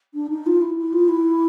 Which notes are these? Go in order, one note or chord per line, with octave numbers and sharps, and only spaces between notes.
D4
D#4
F4
E4
E4
F4
E4